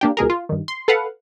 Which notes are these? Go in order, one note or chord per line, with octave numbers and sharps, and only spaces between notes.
A#3 D4 G4
C#2 B2 G#4 A#4
F4
G2 D#3
C6
A4 B4 F5 F#5